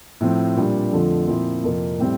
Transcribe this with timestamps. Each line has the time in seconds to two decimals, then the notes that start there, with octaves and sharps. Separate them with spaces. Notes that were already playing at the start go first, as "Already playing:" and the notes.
0.21 A2 F3 C4
0.56 A#2 G3 D4
0.92 F2 D3 F3 A3
1.28 A#2 F3 C4 E4
1.64 F2 C3 F3 A#3
1.99 A2 G3 C4